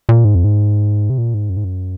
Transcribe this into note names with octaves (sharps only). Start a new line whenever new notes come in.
A#2
G#2
F2
G#2
C3
A#2
G#2
F#2
G#2
F#2